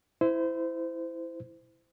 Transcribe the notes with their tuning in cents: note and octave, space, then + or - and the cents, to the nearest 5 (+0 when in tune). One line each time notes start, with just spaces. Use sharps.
E4 +0 C5 -25